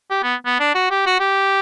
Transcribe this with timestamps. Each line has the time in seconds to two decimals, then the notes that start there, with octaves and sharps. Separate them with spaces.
0.11 G4
0.23 B3
0.46 B3
0.60 D4
0.75 F#4
0.91 G4
1.06 F#4
1.20 G4